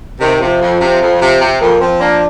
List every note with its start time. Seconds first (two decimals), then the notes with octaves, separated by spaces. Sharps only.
0.20 C3 D#3
0.41 C3 F3
0.61 F2
0.81 C3
1.02 F2
1.21 C3
1.41 C3
1.61 F2 A#3
1.81 F3 C4
2.00 A#3 D4